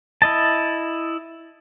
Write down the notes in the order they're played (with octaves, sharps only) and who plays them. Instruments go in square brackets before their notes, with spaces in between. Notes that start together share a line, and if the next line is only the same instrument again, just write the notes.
[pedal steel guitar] E4 D#5 A5